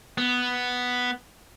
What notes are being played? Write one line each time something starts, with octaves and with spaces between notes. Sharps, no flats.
B3